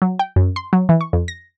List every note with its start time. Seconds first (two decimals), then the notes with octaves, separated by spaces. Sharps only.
0.02 F#3
0.19 G5
0.36 F#2
0.56 C6
0.73 F#3
0.89 E3
1.01 C#6
1.13 F2
1.28 A#6